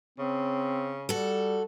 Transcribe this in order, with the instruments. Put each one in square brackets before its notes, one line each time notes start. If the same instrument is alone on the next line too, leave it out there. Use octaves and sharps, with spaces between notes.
[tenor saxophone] C#3 [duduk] C4
[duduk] G3 [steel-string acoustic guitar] F#4 A4